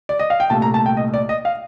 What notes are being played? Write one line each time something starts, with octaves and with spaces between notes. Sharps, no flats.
D5
D#5
F5
G5
C2 A#2 A3 A5
A#5
A5
G5
D#5
D5
D#5
F5